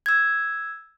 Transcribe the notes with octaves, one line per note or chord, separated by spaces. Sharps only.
E6 G#6